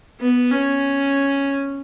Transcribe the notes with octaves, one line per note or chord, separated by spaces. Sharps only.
B3
C#4